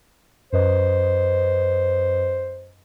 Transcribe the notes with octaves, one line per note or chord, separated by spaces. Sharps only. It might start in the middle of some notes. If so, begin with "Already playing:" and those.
F#2 B4 C5 D#5